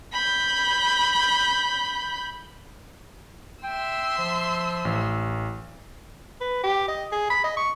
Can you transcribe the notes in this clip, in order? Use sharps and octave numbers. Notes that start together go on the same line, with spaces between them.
B5 G6
E5 G5 C6 E6
F3
A1
B4
G4
D#5
G#4
B5
D#5
C#6